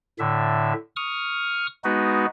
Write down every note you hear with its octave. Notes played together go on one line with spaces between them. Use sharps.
A2 D3 E5
C#6 D#6 F6
G#3 B3 D#4 F#4 B4